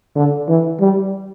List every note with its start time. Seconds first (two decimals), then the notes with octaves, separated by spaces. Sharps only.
0.16 D3
0.48 E3
0.80 G3